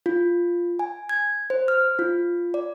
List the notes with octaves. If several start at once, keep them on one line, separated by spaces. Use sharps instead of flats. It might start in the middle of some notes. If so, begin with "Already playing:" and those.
F4
G#5
G#6
C5
F6
F4
D5